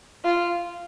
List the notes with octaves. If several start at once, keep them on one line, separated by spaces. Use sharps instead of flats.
F4